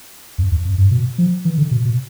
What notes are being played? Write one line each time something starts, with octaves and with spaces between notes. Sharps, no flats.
F2
E2
F2
G2
B2
F3
E3
D3
B2
B2